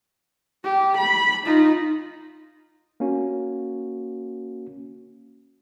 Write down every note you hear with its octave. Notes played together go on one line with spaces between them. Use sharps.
G4
B5
D#4 F4
A#3 C#4 F#4